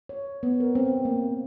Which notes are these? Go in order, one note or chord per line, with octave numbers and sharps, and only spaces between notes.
C#5
B3
A#4
C4
A#3